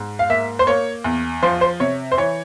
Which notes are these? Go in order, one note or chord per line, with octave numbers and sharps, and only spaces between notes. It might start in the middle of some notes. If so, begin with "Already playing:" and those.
Already playing: G#2
F5
A#3 E5
C5
A#3 C#5
E2
F3 C5
C5
C3 C#5
C5
E3 C#5